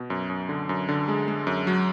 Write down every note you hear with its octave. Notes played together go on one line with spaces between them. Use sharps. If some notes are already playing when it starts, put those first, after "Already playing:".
Already playing: B2
F#2
F#2
D3
F#2
D3
G#3
G#3
F#2
F#3